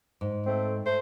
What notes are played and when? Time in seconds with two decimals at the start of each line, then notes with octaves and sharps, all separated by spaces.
0.21 G#2
0.46 A3 C4
0.86 A3 C5